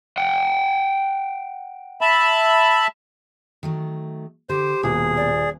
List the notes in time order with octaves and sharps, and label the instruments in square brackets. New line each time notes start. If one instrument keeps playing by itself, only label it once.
[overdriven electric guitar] F#5 G5
[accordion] E5 A5 B5
[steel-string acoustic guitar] D#3 F#3 A3
[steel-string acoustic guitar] D3 [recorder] G4 [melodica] C5
[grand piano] D#1 [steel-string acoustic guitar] B2 A#3 [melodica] G#4
[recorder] D5